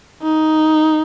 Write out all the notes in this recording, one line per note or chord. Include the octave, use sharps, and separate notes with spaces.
D#4